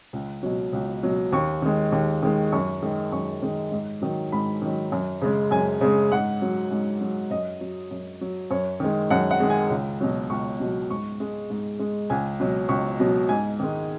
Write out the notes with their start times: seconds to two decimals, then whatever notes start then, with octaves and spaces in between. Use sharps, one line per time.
0.13 C#2
0.43 B2 F#3
0.73 C#2
1.03 B2 F#3
1.32 D#2 C#6
1.62 D#3 G#3
1.92 D#2
2.23 D#3 G#3
2.52 F#2 C#6
2.82 D#3 G#3
3.12 F#2 C#6
3.42 D#3 G#3
3.72 G#2
4.02 D#3 F#3
4.32 G#2 B5
4.62 D#3 F#3
4.92 F#2
5.22 C#3 G#3
5.51 F#2 G#5
5.81 C#3 G#3
6.12 G#2 F#5
6.42 F#3
6.71 G#2
7.01 F#3
7.31 F#2 D#5
7.61 F#3
7.91 F#2
8.21 F#3
8.51 F#2 C#5
8.80 D#3 G#3
9.10 F#2 F#5
9.31 F#5
9.40 D#3 G#3
9.50 G#5
9.70 C#2
10.01 B2 F#3
10.30 C#2 C#6
10.60 B2 F#3
10.90 G#2 C#6
11.20 G#3
11.50 G#2
11.79 G#3
12.10 C#2 G#5
12.40 B2 F#3
12.69 C#2 C#6
13.00 B2 F#3
13.29 G#2 G#5
13.60 D#3 G#3